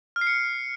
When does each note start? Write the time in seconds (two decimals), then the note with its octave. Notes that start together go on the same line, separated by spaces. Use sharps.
0.16 F6
0.21 C7
0.27 C#7